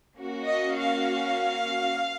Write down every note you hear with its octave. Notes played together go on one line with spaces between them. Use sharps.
A#3 C#4 F#4
D#5
F5